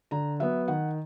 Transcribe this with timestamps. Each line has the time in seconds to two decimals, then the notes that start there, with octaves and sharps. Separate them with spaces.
0.11 D3 A#5
0.40 F#3 B3 E5
0.68 D#3 F#5